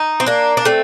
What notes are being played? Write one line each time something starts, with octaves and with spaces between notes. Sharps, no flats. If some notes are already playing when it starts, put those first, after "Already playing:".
Already playing: D#4
C4
A#3 D4
D4
A3 C4